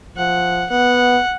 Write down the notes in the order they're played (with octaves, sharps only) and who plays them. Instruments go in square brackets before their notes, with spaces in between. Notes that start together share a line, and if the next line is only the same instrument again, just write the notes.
[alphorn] F3 [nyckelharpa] F#5
[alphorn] B3 [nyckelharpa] F#5